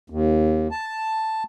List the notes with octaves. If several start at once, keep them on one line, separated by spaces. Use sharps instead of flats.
D#2
A5